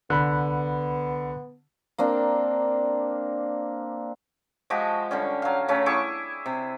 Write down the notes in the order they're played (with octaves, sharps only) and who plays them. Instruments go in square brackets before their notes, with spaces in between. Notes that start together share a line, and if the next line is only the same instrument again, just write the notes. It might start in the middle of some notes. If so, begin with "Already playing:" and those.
[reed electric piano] C2 B5 F#6 [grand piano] D3 [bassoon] B3
[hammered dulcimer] A#3 C4 D4 A#4
F3 G#3 F#4 G4
D3 G3 C#4
F#3 F5
C#3 A3 C#4
E4 G#4 C#6 D6
C3